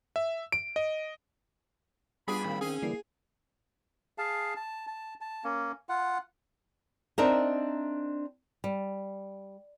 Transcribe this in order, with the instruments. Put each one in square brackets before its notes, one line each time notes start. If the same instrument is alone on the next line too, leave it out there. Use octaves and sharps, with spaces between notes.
[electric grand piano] E5
D7
D#5
[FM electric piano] G3 [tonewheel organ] B3 F4 G4 [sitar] D4 G#4 [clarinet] B5
[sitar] A2 [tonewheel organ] D#3 C4
[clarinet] C#4 [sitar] G#4
[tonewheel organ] D3 E3 G3 [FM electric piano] A#3 E4 C7
[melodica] G#4 F5 A5
A5
A5
A5
A#3 C#4
F4 F#5
[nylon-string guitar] C4 D4 D#4 A#4 D#5 E5
G3